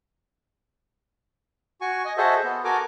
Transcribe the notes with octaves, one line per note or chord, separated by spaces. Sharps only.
F#4 G#5 C#6
D#5 G#5
F#4 G#4 A4 C5 D#5 E5
B3
F#4 A4 A#4 G#5 A#5 D6